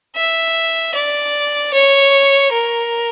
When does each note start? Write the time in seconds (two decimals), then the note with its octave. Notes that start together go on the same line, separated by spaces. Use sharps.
0.16 E5
0.94 D5
1.73 C#5
2.52 A#4